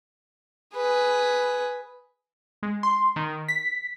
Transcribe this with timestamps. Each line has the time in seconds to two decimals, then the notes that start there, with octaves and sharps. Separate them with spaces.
0.75 G#4 B4
2.63 G#3
2.83 C6
3.16 D#3
3.48 B6